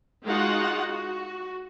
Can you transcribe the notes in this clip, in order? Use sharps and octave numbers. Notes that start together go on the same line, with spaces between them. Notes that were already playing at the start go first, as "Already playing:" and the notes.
G#3 D#4 F4 F#4 F#5
F#4